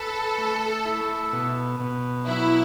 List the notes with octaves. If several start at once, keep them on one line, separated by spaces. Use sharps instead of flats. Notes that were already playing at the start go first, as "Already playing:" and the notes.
Already playing: A4 B4
A3
E4
B2
B2
F#3 E4